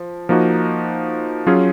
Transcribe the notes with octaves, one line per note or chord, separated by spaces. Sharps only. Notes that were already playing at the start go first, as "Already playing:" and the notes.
Already playing: F3
F3 A#3 D#4 F#4
F#3 C#4 F4 G#4